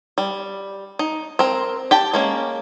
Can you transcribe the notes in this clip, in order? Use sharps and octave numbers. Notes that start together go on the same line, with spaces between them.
G3
D#4
C4 A#4
G4 G5 A5
G#3 A#3 C#4